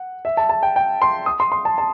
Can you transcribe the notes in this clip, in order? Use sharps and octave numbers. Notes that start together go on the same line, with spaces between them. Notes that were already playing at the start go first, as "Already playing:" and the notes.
Already playing: F#5
E5
A5
A5
G5
G5
C6
D#6
C6
C6
A5
A5